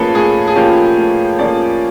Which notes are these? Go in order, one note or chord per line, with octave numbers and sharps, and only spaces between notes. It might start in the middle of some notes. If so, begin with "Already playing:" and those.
Already playing: A2 F3 A#3 C#4 G#4 A4 B4
A2 G#4
G#4
F3 A#3 C#4 G4
A2
F3 A#3 C#4 D5